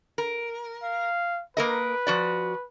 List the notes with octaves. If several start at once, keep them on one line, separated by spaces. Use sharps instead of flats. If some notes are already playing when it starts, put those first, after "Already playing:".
A#4
F5
A#3 A#4 B4 D#5
F3 F#4 D5